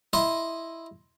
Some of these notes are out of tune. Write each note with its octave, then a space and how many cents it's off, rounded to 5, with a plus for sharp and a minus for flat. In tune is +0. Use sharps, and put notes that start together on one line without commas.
E4 +0 D#5 +0 C6 +0